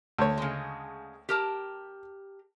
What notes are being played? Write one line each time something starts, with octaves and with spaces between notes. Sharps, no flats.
D2 C#5
C#3 G#3
G4 A#4 A5